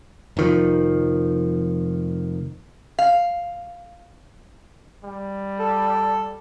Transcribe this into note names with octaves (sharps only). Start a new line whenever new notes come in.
F1 D#3 F3
F5
G3
A4